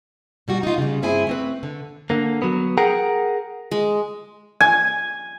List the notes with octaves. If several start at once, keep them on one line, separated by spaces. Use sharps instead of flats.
B2 G3 F#4
D#4 F4
C#3 G3
G2 C4 E4 G#4 G#5
A3 C4 B4
D3
D3 A#3
F#3 B3
G#4 A#4 F#5 G5 A#5
G#3
G#5